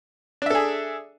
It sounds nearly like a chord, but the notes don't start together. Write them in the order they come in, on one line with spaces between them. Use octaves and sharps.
D4 E5 A4 G#4